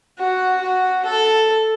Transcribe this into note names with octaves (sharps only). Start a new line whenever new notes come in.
F#4
F#4
A4